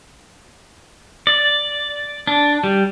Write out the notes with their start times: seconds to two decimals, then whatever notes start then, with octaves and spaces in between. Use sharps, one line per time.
1.27 D5
2.27 D4
2.64 G3